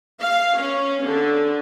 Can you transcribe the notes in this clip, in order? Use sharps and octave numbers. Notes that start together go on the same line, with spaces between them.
F5
C#4
D3